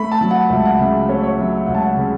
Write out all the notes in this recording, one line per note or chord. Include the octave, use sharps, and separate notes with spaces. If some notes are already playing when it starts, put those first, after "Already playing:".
Already playing: A3 B5
A5
F#3
F#5
C#2 E5
F#5
C#3 E5
A3 C#5
C#5
F#3 E5
E5
C#2 F#5
A5
F#5
C#3